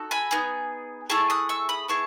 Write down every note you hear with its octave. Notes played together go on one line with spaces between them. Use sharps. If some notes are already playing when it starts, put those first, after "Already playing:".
Already playing: D#4 F#4 A4
G#5 B5
B3 D#4 G#4
A3 E4 G#4 A5 C#6
D#6 F#6
C#6 E6
B5 D#6
B3 E4 G#4 A5 C#6